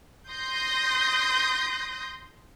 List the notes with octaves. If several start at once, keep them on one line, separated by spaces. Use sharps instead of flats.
C6 D#6 G6 A#6